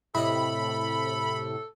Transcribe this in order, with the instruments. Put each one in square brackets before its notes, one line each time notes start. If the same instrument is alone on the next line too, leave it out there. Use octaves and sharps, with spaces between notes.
[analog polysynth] A2 C3 [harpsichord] E4 D#5 [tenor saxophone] A4 [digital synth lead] B5